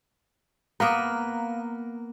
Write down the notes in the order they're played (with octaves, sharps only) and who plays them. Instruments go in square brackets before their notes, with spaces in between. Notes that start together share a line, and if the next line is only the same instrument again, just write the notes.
[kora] A#3 B3 [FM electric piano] F5 A#5